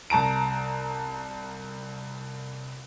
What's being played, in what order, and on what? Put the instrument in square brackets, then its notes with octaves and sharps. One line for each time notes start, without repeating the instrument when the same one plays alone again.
[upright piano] C2 A5 A#5 D7